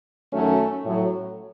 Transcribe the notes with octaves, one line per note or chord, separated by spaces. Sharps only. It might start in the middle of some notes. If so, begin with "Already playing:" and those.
F#2 D#3 F#3 A3 C#4
A2 F#3